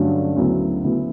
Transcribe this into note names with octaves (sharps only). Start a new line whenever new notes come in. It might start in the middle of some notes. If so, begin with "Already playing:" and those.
Already playing: G2 D3 F#3 A3 C#4
D2 C#3 F#3 B3 E4
D2 C#3 F#3 B3 E4